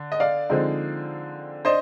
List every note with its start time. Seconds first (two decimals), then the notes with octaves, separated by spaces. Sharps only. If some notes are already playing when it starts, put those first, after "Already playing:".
Already playing: D3
0.12 D#5
0.20 D5 F5
0.50 D3 F3 G#3 C4 D#4
1.65 D4 C5 D#5